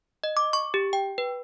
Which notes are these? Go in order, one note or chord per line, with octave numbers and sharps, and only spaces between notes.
D#5
D6
C#6
G4
G5
B4